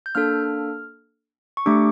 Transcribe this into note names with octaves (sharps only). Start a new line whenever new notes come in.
G6
A#3 D4 A4 F6
C#6
A3 D4 G4 D6